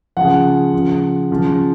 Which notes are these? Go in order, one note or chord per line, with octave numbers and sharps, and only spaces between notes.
C#3 F3 F#5
C#3 F3
C#3 F3